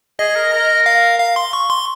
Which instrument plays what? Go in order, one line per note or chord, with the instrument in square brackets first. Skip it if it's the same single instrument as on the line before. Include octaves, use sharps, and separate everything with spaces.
[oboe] G#4 [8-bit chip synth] D#5
[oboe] A#4
A#4
[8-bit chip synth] F5
F5
C6
C#6
C6